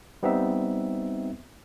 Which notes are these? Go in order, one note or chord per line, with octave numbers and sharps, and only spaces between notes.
G3 B3 C4 D#4 E5